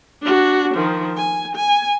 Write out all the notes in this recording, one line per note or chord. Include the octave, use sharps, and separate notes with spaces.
D4 F#4
D#3 F3
G#5
G#5